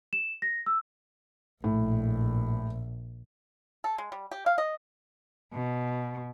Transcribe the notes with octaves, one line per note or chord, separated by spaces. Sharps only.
E7
A#6
E6
A#1 A2
A4
G#3
G3
G4
F5
D#5
B2